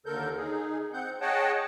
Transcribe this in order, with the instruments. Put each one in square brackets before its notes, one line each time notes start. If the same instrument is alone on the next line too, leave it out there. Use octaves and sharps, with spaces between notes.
[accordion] D#2 D3 A4 A#4 G6
D#4 G#4
C4 F#5 G6
G#4 C#5 D#5 F#5 G5 A5